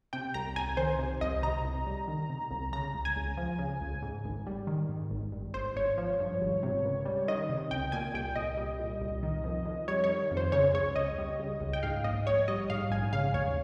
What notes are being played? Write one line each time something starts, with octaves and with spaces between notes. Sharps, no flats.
C3 G5
C2 A#5
C2 G#5
D#3 C5
C3
C2 D#5
C3 A#5
C2
G3
D#3
C3
C2
C#3 A#5
C#2
G#5
C#2
F3
C#3
C#2
G#2
G#1
G3
D#3
G#2
G#1
G2
G#1 C5
G#1 C#5
F3
G2
G#1
C3
C#2
G3
D#3 D#5
C3
C#2 G5
A#2 G#5
C2 G5
C2 D#5
G3
A#2
C2
D#3
F2
F2
G3 C#5
C#5
D#3
F2
C5
C#3 C#5
C#2 C#5
C#2 D#5
G3
C#3
C#2
G5
G#2 F5
A#1 D#5
A#1 C#5
G3 D#5
G#2 F5
A#1 G#5
C#3 F5
D#2 C#5